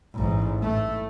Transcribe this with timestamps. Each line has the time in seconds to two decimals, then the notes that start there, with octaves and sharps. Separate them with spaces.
0.14 A1 G#2
0.59 A2 A3